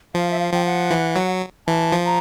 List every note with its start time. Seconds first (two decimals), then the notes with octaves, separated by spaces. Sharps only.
0.15 F3 F5
0.31 E5
0.40 F5
0.53 F3 G5
0.65 F#5
0.90 E3
1.16 F#3
1.67 E3 A5
1.92 F3
2.06 A#5